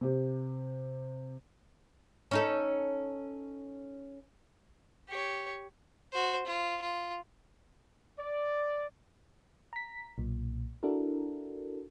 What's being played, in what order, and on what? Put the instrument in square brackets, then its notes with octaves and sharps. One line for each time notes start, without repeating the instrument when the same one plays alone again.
[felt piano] C3 G4
[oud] C#4 D#4 A4
[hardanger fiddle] G4 C#5
F#4 C5
F4
F4
[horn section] D5
[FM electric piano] A#5 B6
B1 A#2
D4 E4 F#4 A4 A#4